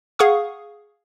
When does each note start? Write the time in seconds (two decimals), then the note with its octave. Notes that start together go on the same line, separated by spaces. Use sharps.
0.19 G#4 F5 F#5 C#6 D#6